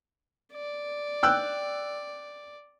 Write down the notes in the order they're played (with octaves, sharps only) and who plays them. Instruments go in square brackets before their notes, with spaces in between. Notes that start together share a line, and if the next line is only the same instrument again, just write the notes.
[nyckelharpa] D5
[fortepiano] G5 E6 F#6